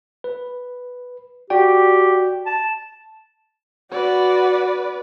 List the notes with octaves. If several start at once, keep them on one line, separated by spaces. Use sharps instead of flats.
B4
F#4 G4 D5 G5
A5
F#4 B4 D5